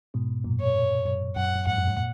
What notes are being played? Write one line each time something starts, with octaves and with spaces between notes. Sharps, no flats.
G#2 B2
F#2 A#2
C#5
F#2
F#2 F#5
F#2
F2 G#2 F#5
F#2
G#2
A#2